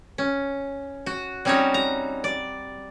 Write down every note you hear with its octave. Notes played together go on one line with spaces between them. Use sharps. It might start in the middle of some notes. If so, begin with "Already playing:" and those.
C#4
F#4
G3 C4 C#4 D#4 F#4 C#5
A#5
D5